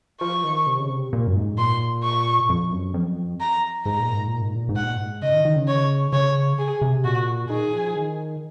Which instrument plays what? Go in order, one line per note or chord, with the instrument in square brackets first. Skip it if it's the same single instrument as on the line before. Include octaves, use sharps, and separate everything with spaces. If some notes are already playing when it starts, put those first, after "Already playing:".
[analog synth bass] F3 [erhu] C#6
[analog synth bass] D#3
C3
C#3
C3
A#2
F#2
G#2
[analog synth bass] A#2 [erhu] C6
[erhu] C#6
[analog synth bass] F2
F#2
F2
[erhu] A#5
[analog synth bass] G#2 [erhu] A#5
[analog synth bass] A#2
G#2
A#2
G#2
A#2
G#2
[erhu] F#5
[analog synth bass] A#2
G#2
[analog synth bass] C#3 [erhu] D#5
[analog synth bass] D#3
D#3
C#3
[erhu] C#5
[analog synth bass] C#3 [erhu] C#5
[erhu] G#4
[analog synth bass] C3
[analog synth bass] A#2 [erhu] F#4
[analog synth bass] D#3 [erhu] G#4
[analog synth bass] F3
D#3